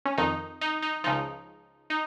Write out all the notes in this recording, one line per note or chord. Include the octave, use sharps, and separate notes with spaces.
C#4
F2 D#3 D#4
D#4
D#4
C#2 C#3 F3 D#4
D#4